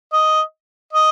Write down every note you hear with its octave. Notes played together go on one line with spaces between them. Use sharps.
D#5
D#5